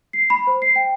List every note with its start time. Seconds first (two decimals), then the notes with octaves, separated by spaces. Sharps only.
0.13 C7
0.30 B5
0.47 C5
0.62 C7
0.76 G5